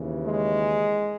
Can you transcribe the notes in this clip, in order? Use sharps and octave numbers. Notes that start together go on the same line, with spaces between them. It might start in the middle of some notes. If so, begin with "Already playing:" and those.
Already playing: D#2 C#3 E3
G#3